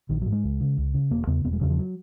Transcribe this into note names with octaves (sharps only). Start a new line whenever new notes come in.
A#1 D#3
G#2 F#3
G#3
C#2
C#3
C#2
C#3
E1 A#3
E2 C#3 B3
E1 B3
G#3
E2 C#3 F#3
F3
F#3